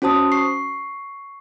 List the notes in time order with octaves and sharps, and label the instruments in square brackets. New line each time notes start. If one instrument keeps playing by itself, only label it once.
[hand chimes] C#4 F#4 C5 A5 D#6
C#6 C7